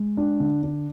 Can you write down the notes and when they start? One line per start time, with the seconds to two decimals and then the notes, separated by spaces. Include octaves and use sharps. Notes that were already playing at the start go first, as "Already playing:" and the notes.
Already playing: G#3
0.17 D4
0.40 D3
0.63 D4